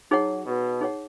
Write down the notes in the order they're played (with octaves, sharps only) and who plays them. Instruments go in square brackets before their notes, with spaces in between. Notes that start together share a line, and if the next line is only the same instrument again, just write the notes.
[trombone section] F#3 [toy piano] D#4 G#4 C#5 F#5
[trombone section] B2
[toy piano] D#4 G#4 C#5 F#5